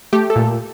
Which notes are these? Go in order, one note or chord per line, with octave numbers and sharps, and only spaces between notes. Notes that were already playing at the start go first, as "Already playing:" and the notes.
A3 G4
A4
A#2